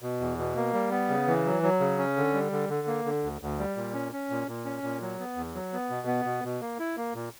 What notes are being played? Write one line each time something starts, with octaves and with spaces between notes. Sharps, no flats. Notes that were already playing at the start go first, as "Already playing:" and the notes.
B2
E2
B2
A#3
G3
B3
C#3
E3
F#3
F#3
C#3
C#4
D3
G3
D3
D3
A#3
D3
D2
D2
G3
A#2
C#4
C#4
A#2
A#2
C#4
A#2
F#3
B3
E2
F#3
B3
B2
B3
B2
B2
A#3
E4
A#3
A#2